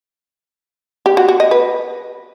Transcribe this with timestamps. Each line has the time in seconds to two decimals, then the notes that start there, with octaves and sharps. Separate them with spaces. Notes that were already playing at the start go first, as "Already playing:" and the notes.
1.06 G4
1.17 F#4
1.28 F#4
1.40 D#5
1.51 B4